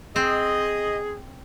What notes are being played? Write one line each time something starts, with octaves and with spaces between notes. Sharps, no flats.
C4 G#4 D#5